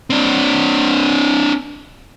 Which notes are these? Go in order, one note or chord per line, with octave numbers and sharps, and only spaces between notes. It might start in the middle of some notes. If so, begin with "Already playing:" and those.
C4 D4